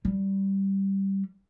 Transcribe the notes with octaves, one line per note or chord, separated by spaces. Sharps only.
G3